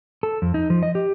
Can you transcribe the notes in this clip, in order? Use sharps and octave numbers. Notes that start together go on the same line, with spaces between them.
A4
F2
D#4
F3
D#5
G4